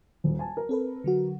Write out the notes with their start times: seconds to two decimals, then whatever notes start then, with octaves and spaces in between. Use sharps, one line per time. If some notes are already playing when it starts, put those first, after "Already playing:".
0.24 D#1
0.39 G#5 A5
0.57 A#4
0.69 C4 A4 B4
1.04 D3 F#3 F#4